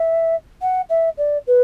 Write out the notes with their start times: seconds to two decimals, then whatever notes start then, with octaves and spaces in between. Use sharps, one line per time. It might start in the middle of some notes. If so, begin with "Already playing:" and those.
Already playing: E5
0.61 F#5
0.89 E5
1.17 D5
1.47 B4